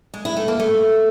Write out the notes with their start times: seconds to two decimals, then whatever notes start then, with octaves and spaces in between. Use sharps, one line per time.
0.14 G#3
0.25 E4
0.37 A3
0.48 A#3
0.59 A3